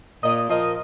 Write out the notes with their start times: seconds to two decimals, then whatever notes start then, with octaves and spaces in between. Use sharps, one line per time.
0.23 A#2 D#5
0.49 F3 A#4 D#5